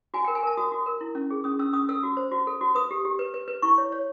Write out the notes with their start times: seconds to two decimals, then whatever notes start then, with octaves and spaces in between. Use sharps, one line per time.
0.14 F#4 G#5
0.24 G5
0.28 A#4
0.35 G#5
0.43 A#4 A5
0.57 F#4 D#6
0.72 F#4
0.86 A#4
1.01 E4
1.15 C#4
1.31 G#4
1.44 C#4 D#6
1.59 C#4 E6
1.73 C#4 D#6
1.89 A4 E6
2.03 F#4
2.17 C5
2.32 F#4
2.47 A4
2.61 F#4
2.75 B4 D#6
2.91 G4
3.05 G4
3.19 B4
3.34 B4
3.48 B4
3.62 E4 C#6
3.78 C#5
3.92 C#5